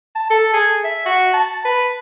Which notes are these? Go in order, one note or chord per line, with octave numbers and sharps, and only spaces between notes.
A5
A4
G#4
E5
F#4
A5
B4